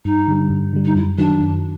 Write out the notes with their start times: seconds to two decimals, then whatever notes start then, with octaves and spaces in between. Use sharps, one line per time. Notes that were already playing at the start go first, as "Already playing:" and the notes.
0.05 G2 D#4
0.27 D3 G3
0.50 G2
0.73 D3 G3
0.84 D#4
0.95 F#2 E4
1.18 D#3 F#3 D4
1.40 F#2